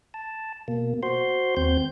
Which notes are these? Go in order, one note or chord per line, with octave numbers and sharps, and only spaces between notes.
A5
B2 A#3
F#4 C5 C6
D#2 C4 G6